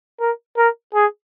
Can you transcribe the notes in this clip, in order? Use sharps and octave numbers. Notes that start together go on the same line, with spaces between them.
A#4
A#4
G#4